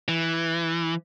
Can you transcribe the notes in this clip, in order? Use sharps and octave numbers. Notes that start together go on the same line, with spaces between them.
E3